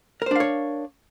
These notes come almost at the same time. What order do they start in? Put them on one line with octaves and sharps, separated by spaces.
A#4 C5 D4 F5 C#5